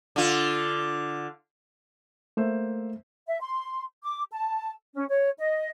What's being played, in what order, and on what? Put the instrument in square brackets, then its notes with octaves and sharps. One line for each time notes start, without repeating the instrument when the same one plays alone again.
[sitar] D3 F4
[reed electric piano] A3 [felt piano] A#3 C5 E5
[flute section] E5
C6
D6
A5
C#4
C#5
D#5